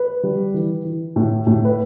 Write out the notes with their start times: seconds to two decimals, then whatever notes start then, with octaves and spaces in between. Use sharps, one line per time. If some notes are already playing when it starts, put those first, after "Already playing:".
Already playing: B4
0.24 G3
0.54 E3
0.85 E3
1.16 A2
1.47 A2
1.65 B4